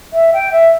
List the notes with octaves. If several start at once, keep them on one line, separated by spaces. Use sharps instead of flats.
E5
G5
E5